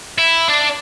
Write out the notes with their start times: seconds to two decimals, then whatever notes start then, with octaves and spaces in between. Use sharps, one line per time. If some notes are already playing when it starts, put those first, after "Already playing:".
0.18 E4
0.48 D4 D5